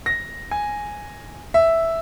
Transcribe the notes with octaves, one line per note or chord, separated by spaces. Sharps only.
A#6
G#5
E5